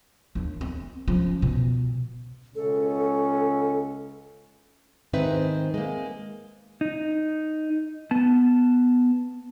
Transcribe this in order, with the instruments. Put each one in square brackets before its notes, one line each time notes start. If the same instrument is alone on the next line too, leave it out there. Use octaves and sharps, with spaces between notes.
[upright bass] D#2 D4
C4
F3 C#4
B2
[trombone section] C#2 C#4 [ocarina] A4
[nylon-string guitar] G#2 D#3 C4 D#4 B4 E5
G#3 A#3
[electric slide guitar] D#4
B3 A5